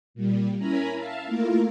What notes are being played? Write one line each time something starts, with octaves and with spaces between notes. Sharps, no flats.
A#2 G3
C#4 E4 A#4 G#5 A#5 B5
E5 F5 A5
A3 A#3 E4 F4 A#4